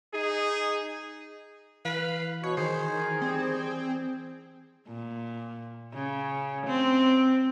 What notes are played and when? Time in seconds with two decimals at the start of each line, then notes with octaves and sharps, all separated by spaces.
0.14 D#4 G#4
1.85 E3 B4 F5
2.43 B2 C#5
2.57 D#3 G#4 C5
3.22 G3 C4
4.88 A#2
5.93 C#3
6.66 C4